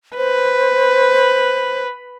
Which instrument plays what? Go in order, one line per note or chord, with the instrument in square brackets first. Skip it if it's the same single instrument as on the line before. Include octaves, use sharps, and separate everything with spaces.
[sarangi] B4 [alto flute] C5